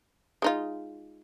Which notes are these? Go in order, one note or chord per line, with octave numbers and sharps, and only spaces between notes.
G#3 D#4 F4